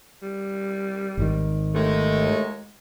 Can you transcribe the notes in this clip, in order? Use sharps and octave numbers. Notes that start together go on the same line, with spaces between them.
G3
G#1 G#2 D#3
D#2 G#3 A3